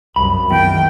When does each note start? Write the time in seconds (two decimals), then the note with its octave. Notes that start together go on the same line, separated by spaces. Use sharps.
0.16 C2 F#2 B5
0.51 E2 D#3 G5